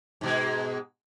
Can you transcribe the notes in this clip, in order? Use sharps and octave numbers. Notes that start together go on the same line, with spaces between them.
G#2 B2 G#3